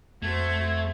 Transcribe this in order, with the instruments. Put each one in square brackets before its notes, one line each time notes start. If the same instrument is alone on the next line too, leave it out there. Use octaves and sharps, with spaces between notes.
[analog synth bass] F2 [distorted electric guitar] A3 [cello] F#4 C5 [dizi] G#6